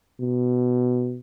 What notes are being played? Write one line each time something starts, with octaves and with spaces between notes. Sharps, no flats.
B2